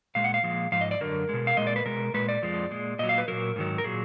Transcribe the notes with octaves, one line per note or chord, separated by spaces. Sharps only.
A#2 G#3 F5
F#5
F5
A#2 F3 G#3
G#2 F3 F5
D#5
D5
F#2 D3 F#3 A#4
B2 G#3
F5
A#2 G#3 D#5
D5
B4
B2 G#3 A#4
A#2 G#3 B4
D5
F2 F3 G#3
A#2 G#3
A#2 F#3 D#5
F5
B4
A#2 F#3 A#4
G#2 D#3 F#3
A#4
A#2 F#3 G#4